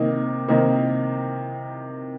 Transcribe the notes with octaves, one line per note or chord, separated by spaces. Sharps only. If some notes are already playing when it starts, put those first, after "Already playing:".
Already playing: C3 D#3 A#3 D#4
C3 D#3 A#3 D#4